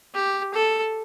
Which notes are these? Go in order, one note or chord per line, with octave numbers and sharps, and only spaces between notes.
G4
A4